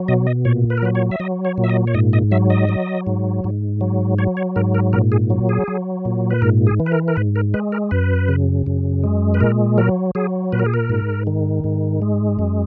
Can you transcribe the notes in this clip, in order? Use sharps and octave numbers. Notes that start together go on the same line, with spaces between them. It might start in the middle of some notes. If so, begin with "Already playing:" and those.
Already playing: F#3
B2 D#5
D#5
A#2 C#5
B4
A#4
F#3 B4
C#5
E5
F#3 D#5
C#5
A#2
E5
D#5
C#5
G#2 D#5
D#5
F#3 E5
D#5
F#3
G#2
G#2
F#3
F#3 C#5
C#5
G#2 A#4
A#4
A#2 A#4
G#4
F#3
G#4
F#3
A#2
B4
G#2 A#4
G#4
E3
B4
A#4
A#4
G#2 B4
A#4
G#3 B4
A#4
F#2 B4
C#3
F#2
G#3
B4
A#2 A#4
F#3 A#4
F#3 G#4
A#2 B4
A#4
G#4
A#4
G#2
D#3
G#2
G#3
F#2